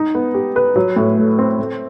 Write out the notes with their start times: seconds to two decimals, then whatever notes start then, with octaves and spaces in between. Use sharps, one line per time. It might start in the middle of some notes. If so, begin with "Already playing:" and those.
Already playing: D#4
0.15 B3
0.34 G4
0.56 B4
0.76 F#3
0.96 A2
1.18 A3
1.39 C4
1.59 A3